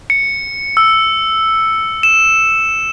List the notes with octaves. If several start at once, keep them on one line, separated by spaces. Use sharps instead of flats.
C#7
E6
E7